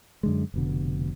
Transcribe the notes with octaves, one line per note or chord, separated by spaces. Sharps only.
F#2 D3 G#3
F1 B2 D3